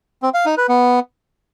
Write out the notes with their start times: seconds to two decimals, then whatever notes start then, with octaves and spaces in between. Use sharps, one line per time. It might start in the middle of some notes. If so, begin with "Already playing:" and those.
0.22 C4
0.34 F5
0.46 D#4
0.57 B4
0.69 B3